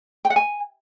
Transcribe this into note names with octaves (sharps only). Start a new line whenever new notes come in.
G5
F#5
G#5